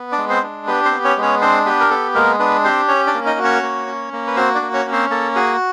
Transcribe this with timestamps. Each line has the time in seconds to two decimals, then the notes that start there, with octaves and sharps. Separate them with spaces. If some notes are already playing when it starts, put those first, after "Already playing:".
Already playing: B3
0.12 D4 D5
0.18 G#3
0.30 C4 C5
0.43 D4
0.67 B3 G4 B4
0.85 C4 C5
0.91 B3
1.04 C#4 C#5
1.17 G#3
1.22 C#4 C#5
1.42 C4 D4 C5
1.65 B3 G4 B4
1.80 A#4
1.90 B3 A4
2.15 G#3 A#3 A#4
2.39 B3 D4 B4
2.64 C4 G4 C5
2.88 C#4 C#5
3.07 D4 D5
3.14 A#3
3.26 D#4 D#5
3.38 F#4
3.44 C#4 C#5
3.63 A#3
3.87 C#4
4.13 A#3
4.27 B4
4.36 C4 F#4 C5
4.55 D4 D5
4.62 A#3
4.73 C#4 C#5
4.86 C#4
4.92 C4 C5
5.10 A#3 A4
5.36 F#4 G#4